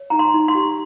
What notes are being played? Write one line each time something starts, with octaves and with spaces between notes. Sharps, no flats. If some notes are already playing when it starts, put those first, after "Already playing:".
Already playing: C#5
D#4 A#5
C6
D#4
C6
G4